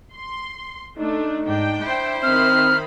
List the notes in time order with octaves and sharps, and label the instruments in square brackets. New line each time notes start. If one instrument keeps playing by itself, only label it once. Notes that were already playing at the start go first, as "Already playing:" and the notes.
[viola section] C6
[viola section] A3 D4 [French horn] D#4
[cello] G#2 [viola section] D4 G5
[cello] E4 C5
[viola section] D#3 D#4 B5 [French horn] C4 [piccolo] F6